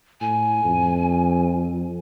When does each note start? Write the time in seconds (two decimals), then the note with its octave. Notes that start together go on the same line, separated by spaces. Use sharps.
0.21 A2 G#5
0.64 F2